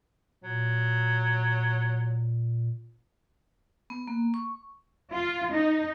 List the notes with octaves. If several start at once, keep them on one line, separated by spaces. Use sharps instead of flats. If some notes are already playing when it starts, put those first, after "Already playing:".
A#2 F#3
B3
A#3
C#6
F4
D#4